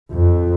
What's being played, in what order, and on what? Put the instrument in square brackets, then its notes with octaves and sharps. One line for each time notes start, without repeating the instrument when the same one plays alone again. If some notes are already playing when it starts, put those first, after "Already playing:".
[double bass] F2